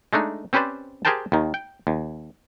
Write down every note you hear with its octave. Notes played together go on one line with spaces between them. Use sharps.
G#3 A3 D4 D#4
C4 C#4 G4 B4 C5 D5
G4 G#4 A#4 C5 G5 A5
D#2 D#3
G5
D#2